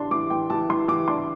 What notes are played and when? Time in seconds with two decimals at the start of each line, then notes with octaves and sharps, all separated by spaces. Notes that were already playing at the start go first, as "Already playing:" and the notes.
Already playing: E3 D4 C6
0.11 E3 D6
0.30 E3 G5
0.50 E3 A5
0.69 E3 C6
0.88 E3 D6
1.08 D4 C6